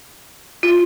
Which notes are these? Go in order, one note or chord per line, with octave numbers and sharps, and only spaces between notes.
F4